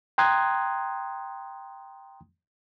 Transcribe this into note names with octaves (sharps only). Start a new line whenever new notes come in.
G5 A#5 C6 D#6 F#6 G#6